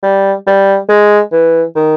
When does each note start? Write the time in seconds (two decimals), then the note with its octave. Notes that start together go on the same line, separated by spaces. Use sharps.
0.03 G3
0.47 G3
0.89 G#3
1.32 E3
1.75 D#3